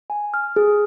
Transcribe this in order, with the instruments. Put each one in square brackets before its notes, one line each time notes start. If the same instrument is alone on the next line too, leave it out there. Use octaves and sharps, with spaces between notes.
[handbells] G#5
F6
G#4